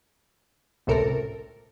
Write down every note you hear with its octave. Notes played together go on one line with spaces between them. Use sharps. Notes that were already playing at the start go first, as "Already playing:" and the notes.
G#1 C#2 A2 C3 A4 A#4